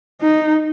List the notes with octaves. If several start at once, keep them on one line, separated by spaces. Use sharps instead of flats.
D#4